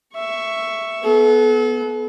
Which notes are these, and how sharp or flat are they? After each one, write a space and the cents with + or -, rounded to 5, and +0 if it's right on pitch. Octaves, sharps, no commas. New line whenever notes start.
E5 +10 C#6 +0
B3 +0 A4 -40